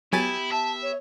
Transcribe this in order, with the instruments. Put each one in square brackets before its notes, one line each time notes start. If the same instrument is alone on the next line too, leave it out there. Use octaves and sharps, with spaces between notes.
[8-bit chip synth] F#3 G#5 A6 [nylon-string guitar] B3 G4 B4 [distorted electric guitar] E4
[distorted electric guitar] E5 [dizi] A5
[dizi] C#5